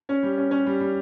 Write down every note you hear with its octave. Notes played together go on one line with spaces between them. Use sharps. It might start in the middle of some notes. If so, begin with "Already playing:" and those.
C#4
G3
C#4
C#4
G3
G3